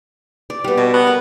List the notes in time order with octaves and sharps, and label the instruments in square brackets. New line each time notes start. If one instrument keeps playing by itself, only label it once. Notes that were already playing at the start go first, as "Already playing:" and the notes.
[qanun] D5
G3 B3
[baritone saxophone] B2 [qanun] A5
[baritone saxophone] B3
[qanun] A#4